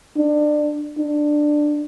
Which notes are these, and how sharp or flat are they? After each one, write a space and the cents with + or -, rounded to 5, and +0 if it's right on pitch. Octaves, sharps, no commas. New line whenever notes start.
D4 +25
D4 +15